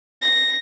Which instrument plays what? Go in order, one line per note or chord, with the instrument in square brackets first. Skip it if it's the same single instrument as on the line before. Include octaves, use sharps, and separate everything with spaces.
[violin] A#6